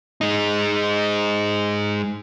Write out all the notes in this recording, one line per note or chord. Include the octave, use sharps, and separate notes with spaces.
G#3 D#4